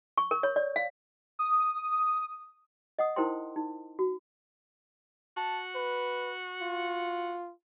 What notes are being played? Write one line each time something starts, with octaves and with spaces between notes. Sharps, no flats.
C#6
A#4
C#5
D5
F5
D#6
D#5 F#5 D#6
D#4 E4 A#4 C5 G5 C6
D#4
F#4
F#4 A5
B4
F4